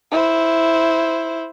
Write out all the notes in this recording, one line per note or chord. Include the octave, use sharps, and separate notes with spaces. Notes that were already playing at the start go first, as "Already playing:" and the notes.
E4 C5